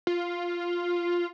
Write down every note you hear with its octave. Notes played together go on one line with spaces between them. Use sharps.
F4